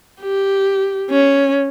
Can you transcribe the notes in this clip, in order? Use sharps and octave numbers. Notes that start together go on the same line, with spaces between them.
G4
C#4